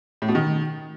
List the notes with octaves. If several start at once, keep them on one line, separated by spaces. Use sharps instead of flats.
A2
B2
D#3